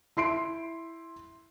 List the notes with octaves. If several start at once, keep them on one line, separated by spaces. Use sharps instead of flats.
E4 C6 C7 D7